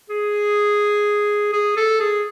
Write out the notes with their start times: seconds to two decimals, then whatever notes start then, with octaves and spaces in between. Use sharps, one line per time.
0.09 G#4
1.53 G#4
1.77 A4
2.00 G#4